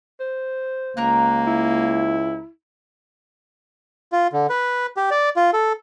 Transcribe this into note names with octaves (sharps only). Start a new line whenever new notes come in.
C5
C#2 A#3 A#4 A#5 F#6
E4
F4
D3
B4
G4
D5
F4
A4